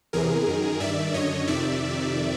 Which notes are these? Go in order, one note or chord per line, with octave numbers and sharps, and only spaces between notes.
E2 C3 E3 G#4 A#4
F#2 D#3
G2 D#3 D5 E5
F#2 D3 C#5 D#5
F2 C3 D#3 D5 E5